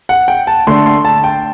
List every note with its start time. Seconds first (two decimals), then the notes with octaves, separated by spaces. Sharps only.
0.09 F#5
0.28 G5
0.47 A5
0.67 D3 A3 D4 C6
0.86 C6
1.05 A5
1.24 G5